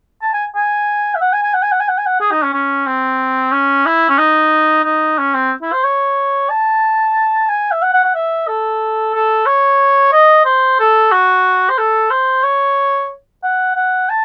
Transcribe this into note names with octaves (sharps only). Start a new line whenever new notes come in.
A5
G#5
G#5
E5
F#5
G#5
G#5
F#5
G#5
F#5
G#5
F#5
G#5
F#5
G#4
D#4
C#4
C#4
C4
C#4
E4
C#4
D#4
D#4
C#4
C4
E4
C5
C#5
A5
G#5
E5
F#5
F#5
F#5
E5
A4
A4
C#5
D#5
C5
A4
F#4
C5
A4
C5
C#5
F#5
F#5
A5